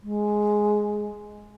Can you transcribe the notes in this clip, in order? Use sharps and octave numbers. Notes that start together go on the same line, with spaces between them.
G#3